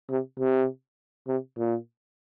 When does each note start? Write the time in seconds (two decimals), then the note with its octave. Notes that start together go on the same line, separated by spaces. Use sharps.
0.10 C3
0.40 C3
1.28 C3
1.58 A#2